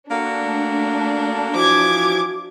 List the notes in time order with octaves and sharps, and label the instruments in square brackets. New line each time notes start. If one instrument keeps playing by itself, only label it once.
[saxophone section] A#3 F#4 A4 [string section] D4
[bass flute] A3
[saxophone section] E3 F3 [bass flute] F#4 [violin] D6 G#6